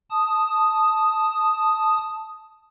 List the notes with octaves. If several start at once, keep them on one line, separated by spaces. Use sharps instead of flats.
A5 D#6